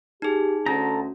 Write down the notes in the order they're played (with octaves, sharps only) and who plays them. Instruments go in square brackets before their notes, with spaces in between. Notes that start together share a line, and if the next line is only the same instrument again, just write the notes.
[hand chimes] D#4 G#4 [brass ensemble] G4
[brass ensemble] D2 [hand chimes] C#4 F#4 [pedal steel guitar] A4 A#5